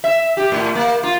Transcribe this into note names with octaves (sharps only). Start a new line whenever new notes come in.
E5
G4
A2
A#3
F4